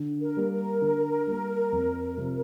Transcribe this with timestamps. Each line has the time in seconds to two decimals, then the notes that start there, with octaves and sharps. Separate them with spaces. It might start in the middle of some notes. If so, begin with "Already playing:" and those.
Already playing: D3
0.22 A#4
0.37 G3 A#3
0.52 A#4
0.82 D3
1.27 G3 A#3
1.72 F2
2.17 C3 F3